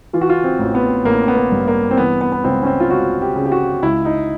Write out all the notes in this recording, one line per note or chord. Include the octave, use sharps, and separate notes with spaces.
E3 F4
F#4
F4
C4
A1
B3
A1 A#3
B3
A#3
G2
A#3
C4
E3 B3
B3
B3
C#2 C4
C#4
C4
F4
C#2 F#4
G4
C#3
G4
F#4
C#2 E4
D#4